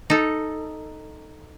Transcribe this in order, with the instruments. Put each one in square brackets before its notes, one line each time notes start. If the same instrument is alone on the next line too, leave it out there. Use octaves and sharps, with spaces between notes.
[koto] D#4 A4